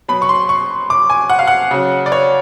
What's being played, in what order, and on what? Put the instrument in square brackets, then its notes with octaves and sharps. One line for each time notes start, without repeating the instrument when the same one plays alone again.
[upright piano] B2 F#3 B5
C#6
C6
C#6
D6
G#5
F#5
F5
F#5
C#3 F#3
D5
C#5